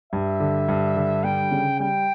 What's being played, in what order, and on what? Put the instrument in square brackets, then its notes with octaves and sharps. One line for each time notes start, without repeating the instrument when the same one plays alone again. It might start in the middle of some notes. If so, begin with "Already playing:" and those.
[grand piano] G2 [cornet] E5
[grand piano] D3
G2
D3
[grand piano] G3 [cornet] G5
[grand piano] C#3
[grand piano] G3 [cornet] G5